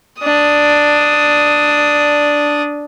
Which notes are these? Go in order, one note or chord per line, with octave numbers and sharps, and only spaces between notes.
D4 D#6